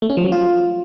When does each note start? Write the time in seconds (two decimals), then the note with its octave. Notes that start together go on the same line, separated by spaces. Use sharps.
0.02 A3
0.10 C#4
0.17 F3
0.25 F#3
0.32 F4